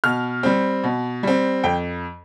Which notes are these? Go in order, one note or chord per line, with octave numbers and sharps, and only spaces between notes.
B2 F6
G3 C4
B2
G3 C4
F2 G5